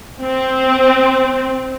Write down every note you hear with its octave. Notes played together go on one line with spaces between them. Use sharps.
C4